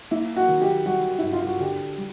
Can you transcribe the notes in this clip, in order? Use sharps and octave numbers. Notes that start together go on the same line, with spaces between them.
A#3 E4
F#4
D#3
G4
G3 F#4
G2 E4
F4
F#4
D3 G4
G3